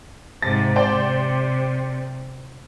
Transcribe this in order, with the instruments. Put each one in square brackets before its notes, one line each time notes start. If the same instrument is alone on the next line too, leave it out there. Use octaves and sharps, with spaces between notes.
[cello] G#2 C3 [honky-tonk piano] A6
[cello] C3 [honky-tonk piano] C5 D5 G5